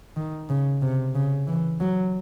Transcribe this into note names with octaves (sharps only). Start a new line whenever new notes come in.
D#3
C#3
C3
C#3
E3
F#3